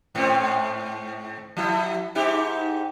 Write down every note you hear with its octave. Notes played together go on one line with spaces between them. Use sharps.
G#2 C4 C#4
F3 E4
G#2 D#4 G4